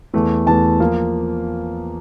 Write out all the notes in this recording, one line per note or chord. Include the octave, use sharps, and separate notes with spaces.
E2 E3 A3
E2 E3 A3 A5
F3 A#3